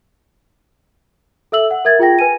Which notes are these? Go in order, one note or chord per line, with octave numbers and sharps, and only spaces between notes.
A4 E5 E6 F#7
F#5
A#4 E5 G#6 A6
F4 G#4 G5 A#6
B4 G#5 D#7